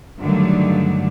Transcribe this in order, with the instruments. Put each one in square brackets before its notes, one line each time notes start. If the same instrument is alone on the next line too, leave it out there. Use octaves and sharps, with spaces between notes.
[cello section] G2 D3 D#3 F#3 A3